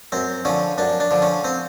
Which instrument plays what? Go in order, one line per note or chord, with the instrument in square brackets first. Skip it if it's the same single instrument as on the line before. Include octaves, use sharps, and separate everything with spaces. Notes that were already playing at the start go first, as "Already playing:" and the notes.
[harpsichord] F#2 C4
D3 F3 C#4
F#2 D4
D4
D3 F3
C#4
C4